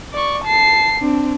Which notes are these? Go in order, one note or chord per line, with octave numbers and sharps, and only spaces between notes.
D5 C#6
A5 C7
C4 D4